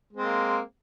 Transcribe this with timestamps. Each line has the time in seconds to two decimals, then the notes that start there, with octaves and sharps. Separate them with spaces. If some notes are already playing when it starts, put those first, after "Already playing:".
0.13 G#3
0.17 C4
0.21 A#3